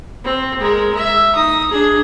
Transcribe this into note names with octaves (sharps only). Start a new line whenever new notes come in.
C4
G#3 A#4
E5
D#4 D#6
D4 G#4